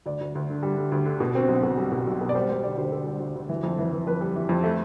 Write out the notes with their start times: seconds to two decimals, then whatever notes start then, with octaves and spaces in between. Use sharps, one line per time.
0.06 D2 D5
0.21 D2
0.35 D2
0.50 D3
0.63 G3
0.77 D3
0.92 D2
1.06 D3
1.20 B2
1.35 C4
1.49 B1
1.63 B2
1.77 G3
1.91 B2
2.07 B1
2.21 B2
2.29 D5
2.35 G3 C5
2.49 E1 C5
2.64 D3 D5
2.77 D2 C5
2.92 D3 A4
3.06 G3
3.20 D2
3.36 D2
3.49 E3
3.63 F2
3.79 E3
3.92 E3
4.06 F2 B4
4.21 G3
4.36 E3
4.49 F2
4.64 A3